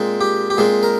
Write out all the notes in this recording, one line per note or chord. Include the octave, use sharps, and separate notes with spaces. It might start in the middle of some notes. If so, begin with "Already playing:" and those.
Already playing: A#2 G#3 C4
G4
G4
A#2 G#3 C4 G#4
A#4